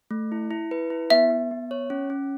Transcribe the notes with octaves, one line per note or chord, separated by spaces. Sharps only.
A3
E4
E4
B4
E4
B3 E5
B3
B3
C#5
C#4
C#4